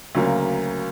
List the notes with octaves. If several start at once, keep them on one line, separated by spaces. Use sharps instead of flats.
D2 C#3 F#3 A#3